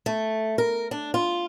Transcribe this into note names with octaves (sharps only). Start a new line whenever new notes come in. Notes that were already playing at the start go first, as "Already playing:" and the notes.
A3
A#4
D4
F4